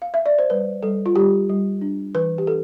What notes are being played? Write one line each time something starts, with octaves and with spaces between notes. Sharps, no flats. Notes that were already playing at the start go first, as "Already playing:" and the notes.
F5
E5
D5
C5
G3 B4
G3 A4
F4
G3 G4
G3
D4
E3 B4
G4
D4 A4